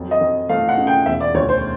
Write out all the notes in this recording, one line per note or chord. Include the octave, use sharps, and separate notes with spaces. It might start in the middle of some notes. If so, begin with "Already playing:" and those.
Already playing: F2 F#3
D#5
F2
A3 F5
F#5
C#3
G5
E1 E5
D5
D2 C#5
C5